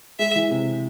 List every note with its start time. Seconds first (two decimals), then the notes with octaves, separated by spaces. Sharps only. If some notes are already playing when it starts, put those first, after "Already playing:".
0.19 G#3 E5
0.35 E3
0.51 C3